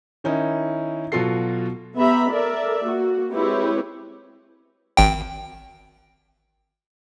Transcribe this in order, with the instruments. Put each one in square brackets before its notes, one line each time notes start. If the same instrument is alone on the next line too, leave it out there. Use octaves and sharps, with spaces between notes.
[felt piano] D#3 C#4 D#4 E4
B2 F#3 F4 F#4 A4 C7
[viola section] B3 G4 E5 A#5 B5
A4 A#4 D5 E5
A#3 F#4
G#3 C4 E4 G4 B4 C#5
[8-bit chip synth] G#1 G5